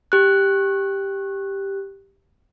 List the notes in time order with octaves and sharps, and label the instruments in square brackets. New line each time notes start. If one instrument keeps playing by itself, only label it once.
[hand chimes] G4 F#6